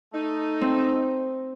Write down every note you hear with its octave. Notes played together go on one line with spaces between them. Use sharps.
A3 D#4
C4